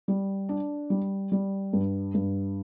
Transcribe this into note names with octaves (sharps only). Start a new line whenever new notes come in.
G3
D4
G3
G3
G2
G2